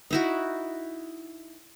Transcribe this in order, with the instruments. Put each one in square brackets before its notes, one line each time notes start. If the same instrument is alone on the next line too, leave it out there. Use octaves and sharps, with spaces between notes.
[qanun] D#4 E4 F#4